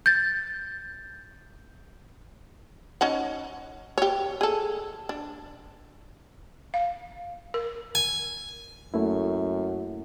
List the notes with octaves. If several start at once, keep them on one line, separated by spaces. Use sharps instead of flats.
G6 A6
C#4 D#4 F#5
G4 C#5
G#4 A4
D4
F5
A#4
G#5
F#2 A3 A#3 E4